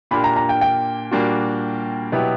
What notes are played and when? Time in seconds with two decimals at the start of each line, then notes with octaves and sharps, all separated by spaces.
0.11 A#2 A#3 D4 G4 B5
0.24 A#5
0.36 A#5
0.49 G5
0.61 G5
1.11 A#2 G3 A#3 D4 F#4
2.12 B2 F#3 B3 E4 G4